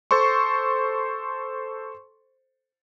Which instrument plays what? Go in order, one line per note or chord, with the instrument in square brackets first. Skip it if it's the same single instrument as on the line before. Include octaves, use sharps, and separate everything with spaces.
[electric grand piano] A4 C5 C6 C#6